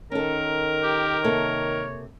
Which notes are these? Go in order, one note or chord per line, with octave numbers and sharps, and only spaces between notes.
D#3 C#4 A4 A#4
G4
C3 A#3 A4 C#5